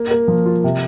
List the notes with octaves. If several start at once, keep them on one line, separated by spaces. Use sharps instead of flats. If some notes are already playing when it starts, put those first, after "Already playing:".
Already playing: A#3
A#3
F3
F4
C3